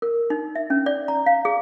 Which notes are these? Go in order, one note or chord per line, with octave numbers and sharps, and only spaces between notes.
A#4
D#4
E5
C#4
D5
A#5
F5
G#4